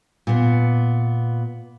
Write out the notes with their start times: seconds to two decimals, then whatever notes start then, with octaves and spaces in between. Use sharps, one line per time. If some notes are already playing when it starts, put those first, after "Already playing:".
0.27 A#2 B3